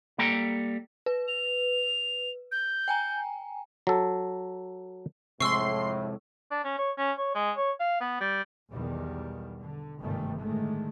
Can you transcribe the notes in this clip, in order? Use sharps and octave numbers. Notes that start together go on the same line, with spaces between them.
G3 A#3 A4 G5 A#5
B4
F7
G6
G5 G#5 A#5
F#3 A4
F2 A2 C3 G#3 C6 C#6 E6 C7
D4
C#4
C#5
C#4
C#5
G#3
C#5
F5
B3
G3
B1 E2 B2 D#3 G3
D3
G1 G#2 C3 D#3 G3 A3
A2 D3 D#3 G#3 A3